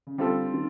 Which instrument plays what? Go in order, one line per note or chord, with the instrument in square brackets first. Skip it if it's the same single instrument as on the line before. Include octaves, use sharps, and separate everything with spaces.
[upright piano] C#3
[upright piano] D3 [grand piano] G3 C4 F4 A4
[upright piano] D#3